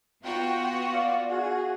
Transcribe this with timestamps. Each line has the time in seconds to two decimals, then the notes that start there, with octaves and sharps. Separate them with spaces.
0.23 B3 F4 F#4 G5
0.93 D5 F5
1.30 F#4 G#4